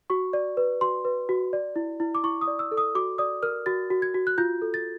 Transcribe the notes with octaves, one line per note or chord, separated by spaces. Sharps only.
F#4 C#6
D5
B4
F#4 C6
B4
F#4
D5
E4
E4
D6
E4 C#6
D#6
D5
E6
A4
D#6
F#4 D6
D5 D#6
A#4 F6
F#4 A6
F#4
G#6
F#4
F#6
F4 G6
A4
A6